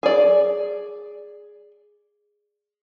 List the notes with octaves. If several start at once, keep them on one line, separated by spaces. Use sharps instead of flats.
G#4 D5